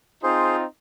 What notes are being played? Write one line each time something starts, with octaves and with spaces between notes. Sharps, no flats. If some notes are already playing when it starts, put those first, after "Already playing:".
C4 D#4 F4 G#4 C5